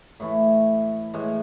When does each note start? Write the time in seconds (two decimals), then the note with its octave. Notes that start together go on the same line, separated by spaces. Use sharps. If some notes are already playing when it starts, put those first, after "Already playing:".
0.20 A2 E3 A3 E4
1.14 A2 E3 G#3